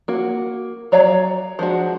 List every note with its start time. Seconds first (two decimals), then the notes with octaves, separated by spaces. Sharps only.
0.08 A#3 F#4
0.92 F#3 C#5 D5 F5 A#5
1.59 F3 G#3 D4 F#4